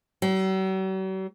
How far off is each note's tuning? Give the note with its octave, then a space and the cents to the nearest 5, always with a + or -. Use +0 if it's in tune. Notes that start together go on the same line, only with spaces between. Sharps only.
F#3 +45